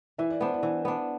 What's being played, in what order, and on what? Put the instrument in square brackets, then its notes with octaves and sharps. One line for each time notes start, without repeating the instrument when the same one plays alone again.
[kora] E3 [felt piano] E5
[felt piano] D5
[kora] B3 D4 [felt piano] C5
[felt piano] D5
[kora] E3
B3 D4